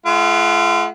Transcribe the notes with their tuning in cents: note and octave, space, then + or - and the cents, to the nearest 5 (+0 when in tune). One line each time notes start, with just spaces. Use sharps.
G#3 +45 F4 -35 F#5 +0